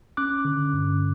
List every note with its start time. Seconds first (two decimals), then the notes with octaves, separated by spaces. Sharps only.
0.17 C#4 D6 F#6
0.45 D3
0.73 G2